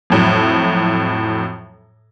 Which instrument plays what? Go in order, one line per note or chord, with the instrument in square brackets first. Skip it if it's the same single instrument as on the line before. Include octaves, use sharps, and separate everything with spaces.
[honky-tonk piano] F2 A2 F#3